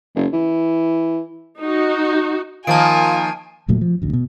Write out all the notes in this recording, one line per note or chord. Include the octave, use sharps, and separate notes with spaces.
F#1
E3
D#4 F#4
D#3 F3 A#3 F4 G#5 A5 D7
E1 A#2 F#3 A3
F3
A1 D2
B2